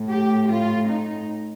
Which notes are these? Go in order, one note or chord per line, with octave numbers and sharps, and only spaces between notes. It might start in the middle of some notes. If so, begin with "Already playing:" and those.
Already playing: A2
G4
F4
D#4